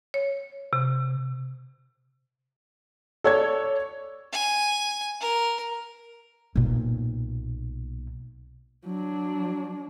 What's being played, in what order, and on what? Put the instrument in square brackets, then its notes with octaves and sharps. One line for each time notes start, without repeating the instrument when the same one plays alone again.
[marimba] C#5
C3
[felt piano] A4 C#5 D5 G#6
[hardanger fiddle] G#5
A#4
[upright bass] B1 A#2
[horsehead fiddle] F#3 D4